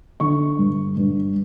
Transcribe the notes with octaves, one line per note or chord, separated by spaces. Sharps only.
D3 C#6
G2
G2